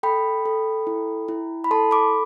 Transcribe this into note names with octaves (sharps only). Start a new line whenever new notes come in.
A4 G5 B5
A4
E4
E4
B5
A4 A5 C6
B5 D6